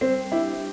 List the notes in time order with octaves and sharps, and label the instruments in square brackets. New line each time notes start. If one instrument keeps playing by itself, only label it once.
[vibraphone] G3 [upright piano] C4
[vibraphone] D4 G4 [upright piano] E4